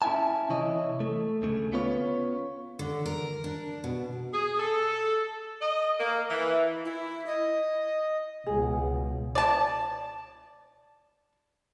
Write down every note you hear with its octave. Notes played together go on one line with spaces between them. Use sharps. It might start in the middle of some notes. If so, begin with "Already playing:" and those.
C#4 E4 F4 E5 G#5 A5
C3 E3 E4 C#5 D#5
A3
D2 C#3 A3
B3 C#4 F4 B4 C#5
D3
A#4
D4
B2
G#4
A4
D#5
A#3
E3
E4
D#5
C#2 B2 G#4
D5 A5